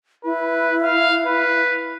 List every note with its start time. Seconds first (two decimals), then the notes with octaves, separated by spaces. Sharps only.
0.25 E4 B4
0.83 F5
1.26 B4